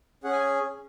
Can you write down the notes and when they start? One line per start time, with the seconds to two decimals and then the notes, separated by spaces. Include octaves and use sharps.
0.24 C#4 G#4 F#5
0.32 G#5